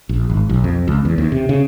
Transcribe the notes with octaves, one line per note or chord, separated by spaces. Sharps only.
A#1
G#1
B1
F2
C#2
E2
D#2
C3
C#3